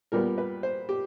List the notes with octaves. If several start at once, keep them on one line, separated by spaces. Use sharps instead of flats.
A#2 G3 B3 A#4
B4
C5
G4